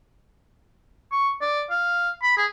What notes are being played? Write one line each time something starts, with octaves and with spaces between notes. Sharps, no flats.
C#6
D5
F5
B5
G#4